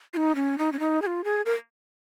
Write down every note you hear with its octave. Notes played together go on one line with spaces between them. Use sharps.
F4
D#4
C#4
D#4
C#4
D#4
G#4
F4
G#4
A#4